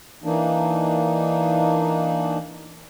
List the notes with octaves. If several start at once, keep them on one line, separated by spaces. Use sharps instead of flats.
E3 A#3 D4 D#4